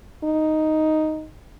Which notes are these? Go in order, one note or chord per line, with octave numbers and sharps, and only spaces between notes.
D#4